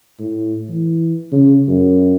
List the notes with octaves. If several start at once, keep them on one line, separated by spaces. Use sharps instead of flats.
A2
E3
C#3
F#2